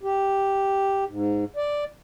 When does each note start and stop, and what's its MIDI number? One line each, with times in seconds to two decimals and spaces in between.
0.03 1.04 67
1.08 1.44 44
1.56 1.84 74